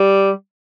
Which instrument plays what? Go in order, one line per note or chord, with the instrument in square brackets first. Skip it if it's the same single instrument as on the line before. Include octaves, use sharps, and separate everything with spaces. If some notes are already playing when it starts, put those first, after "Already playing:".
Already playing: [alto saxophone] G3